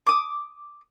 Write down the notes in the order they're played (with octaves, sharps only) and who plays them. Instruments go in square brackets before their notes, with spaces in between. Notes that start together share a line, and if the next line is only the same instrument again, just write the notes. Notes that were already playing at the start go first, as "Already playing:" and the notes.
[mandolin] D6 D#6